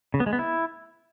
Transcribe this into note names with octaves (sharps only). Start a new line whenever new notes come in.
C#3
B3
G#3
B3
E4